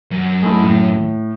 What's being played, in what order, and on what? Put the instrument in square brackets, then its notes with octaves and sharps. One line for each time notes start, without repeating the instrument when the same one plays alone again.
[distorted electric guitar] F#2
[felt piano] G#3 A3 E4
A2